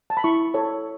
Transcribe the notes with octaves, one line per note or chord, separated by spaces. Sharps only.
A5
B5
E4 C#6
A4 C#5